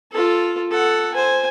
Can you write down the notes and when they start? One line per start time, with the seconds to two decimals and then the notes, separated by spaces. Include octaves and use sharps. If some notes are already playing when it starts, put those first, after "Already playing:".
0.12 F4 A4
0.71 A4 F#5
1.14 C5 G#5